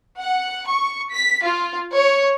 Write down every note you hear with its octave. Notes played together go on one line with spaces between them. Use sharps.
F#5
C#6
B6
F4
C#5